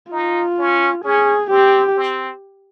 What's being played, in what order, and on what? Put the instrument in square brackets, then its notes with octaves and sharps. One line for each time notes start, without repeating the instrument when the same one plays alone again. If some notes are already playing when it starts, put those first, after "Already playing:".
[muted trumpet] D#4 [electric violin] F4
[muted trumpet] C#4
[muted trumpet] C#4 [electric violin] G#4
[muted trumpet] C4 [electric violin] G4
[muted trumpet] C4